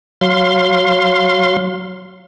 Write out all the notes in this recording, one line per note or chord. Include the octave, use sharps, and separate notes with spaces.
F#3 F5 C6